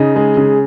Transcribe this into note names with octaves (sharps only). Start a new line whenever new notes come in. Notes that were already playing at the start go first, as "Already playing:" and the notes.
Already playing: C#3 D#4
G#3
C#3